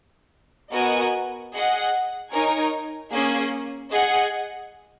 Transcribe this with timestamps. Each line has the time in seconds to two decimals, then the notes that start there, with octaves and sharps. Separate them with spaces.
0.72 B3 F#4 A#4 D#5 G#5
1.52 G#4 D#5 F#5
2.31 D#4 A#4 C#5 G#5
3.11 A#3 C#4 G#4
3.91 G#4 D#5 F#5